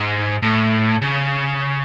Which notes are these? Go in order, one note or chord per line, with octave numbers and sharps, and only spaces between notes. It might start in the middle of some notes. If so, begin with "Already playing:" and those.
Already playing: G#2
A2
C#3